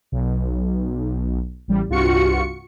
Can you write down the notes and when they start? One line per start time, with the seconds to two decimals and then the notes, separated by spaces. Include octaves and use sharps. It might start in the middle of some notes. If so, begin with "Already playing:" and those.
0.12 B1
1.68 A1 G3
1.89 C2 G2 F4 F#4 C#6 C#7